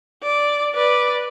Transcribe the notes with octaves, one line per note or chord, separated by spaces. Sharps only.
D5
B4 D5